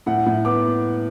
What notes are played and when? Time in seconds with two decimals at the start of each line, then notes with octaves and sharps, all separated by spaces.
0.06 A2 F#5
0.26 A2
0.45 B3 D6